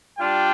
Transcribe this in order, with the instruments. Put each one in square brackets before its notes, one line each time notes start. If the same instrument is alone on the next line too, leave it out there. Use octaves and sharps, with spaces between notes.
[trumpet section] G3 D4 F4 G5